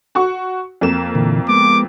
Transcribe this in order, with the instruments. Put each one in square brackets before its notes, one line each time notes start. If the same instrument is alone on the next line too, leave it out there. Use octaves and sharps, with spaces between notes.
[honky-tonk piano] F#4 C#6
F2 A#3 E7
[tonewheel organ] A#2 D3 E3
[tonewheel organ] G#3 B3 [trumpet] D6